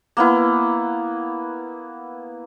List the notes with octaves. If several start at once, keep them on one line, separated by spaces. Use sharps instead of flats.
A#3 B3 E4